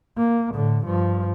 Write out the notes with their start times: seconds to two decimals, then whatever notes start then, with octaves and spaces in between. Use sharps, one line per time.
0.17 A#3
0.54 A2 D3
0.85 G2 F3